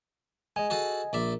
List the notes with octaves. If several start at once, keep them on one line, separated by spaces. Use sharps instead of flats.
G#3 D#5 G#5
F#4 G#4 A4
A#1 D5 E5